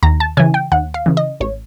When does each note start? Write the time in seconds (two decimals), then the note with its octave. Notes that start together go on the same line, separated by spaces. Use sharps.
0.03 D#2 A#5
0.20 A5
0.37 C#3 E3 G#5
0.54 G5
0.72 D#2 F#5
0.94 F5
1.06 C#3 E3
1.17 D#5
1.40 A1 C#5